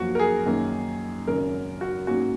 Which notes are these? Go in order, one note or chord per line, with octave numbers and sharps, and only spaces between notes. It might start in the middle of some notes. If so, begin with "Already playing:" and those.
Already playing: F#2 F3 A#3 F#4
A#4
G#4
F#2 D#3 A#3
G#1 F#2 C#3 A#4
F#4
G#2 F#3 A#3 C#4 F#4